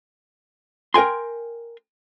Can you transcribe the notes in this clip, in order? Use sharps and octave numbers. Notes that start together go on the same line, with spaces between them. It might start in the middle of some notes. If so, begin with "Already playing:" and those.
A#4 G5 G#5 C6